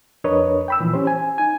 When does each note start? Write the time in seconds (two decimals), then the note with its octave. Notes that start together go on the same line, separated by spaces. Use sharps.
0.24 F2 D4 A#4 B4 C#5 D#5
0.68 G5 B5 E6
0.80 A#2 E3 F3
0.94 C#4 G4 C5
1.07 G#5
1.38 D#4 G#5